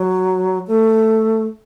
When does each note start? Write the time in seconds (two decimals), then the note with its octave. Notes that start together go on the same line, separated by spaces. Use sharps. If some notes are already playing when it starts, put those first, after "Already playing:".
Already playing: F#3
0.68 A3